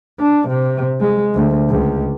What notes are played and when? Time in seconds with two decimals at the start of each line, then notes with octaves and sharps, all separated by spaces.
0.19 D4
0.49 C3
1.00 G#3
1.35 D2
1.69 C#2